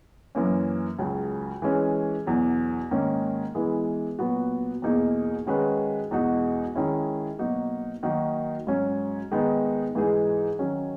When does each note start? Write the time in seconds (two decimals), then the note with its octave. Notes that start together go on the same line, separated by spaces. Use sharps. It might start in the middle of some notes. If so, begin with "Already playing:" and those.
0.35 F#2 E3 A#3 C#4
0.99 C#2 C#3 F#3
1.62 E3 G#3 C#4
2.26 E2 B2 F#3
2.91 G#2 D#3 A#3 C#4
3.55 E3 G#3 B3 E4
4.19 A#2 F#3 B3 F#4
4.82 E2 B2 A#3 D#4 G#4
5.47 D#3 G#3 C#4 F#4 B4
6.11 E2 B2 G#3 D#4 F#4
6.75 D#3 G#3 C#4 E4
7.39 B2 F#3 A#3 D#4 F#4
8.03 D#3 F#3 A#3 D#4 F#4
8.67 G#2 F#3 C#4
9.31 D#3 G#3 B3 D#4
9.95 G#2 E3 G#3 D#4 G#4
10.59 D#3 F#3 C#4